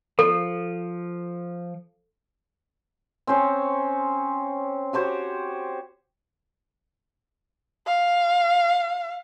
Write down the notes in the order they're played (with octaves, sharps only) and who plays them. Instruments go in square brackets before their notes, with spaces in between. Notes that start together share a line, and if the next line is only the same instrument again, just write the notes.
[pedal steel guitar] F3 [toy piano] A4
[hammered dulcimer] C4 C#4 C5 C#5
F#4 G4 C5 C#5
[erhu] F5